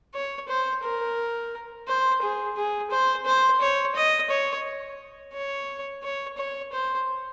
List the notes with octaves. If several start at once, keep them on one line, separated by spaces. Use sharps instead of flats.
C#5
C5
A#4
C5
G#4
G#4
C5
C5
C#5
D#5
C#5
C#5
C#5
C#5
C5